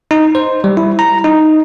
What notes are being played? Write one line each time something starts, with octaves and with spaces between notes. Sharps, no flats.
D#4
C5
G3
E4
A#5
D#4